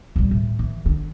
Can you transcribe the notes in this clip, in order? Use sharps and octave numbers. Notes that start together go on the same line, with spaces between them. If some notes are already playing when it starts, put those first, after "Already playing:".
D1 G3
A2
E3
D3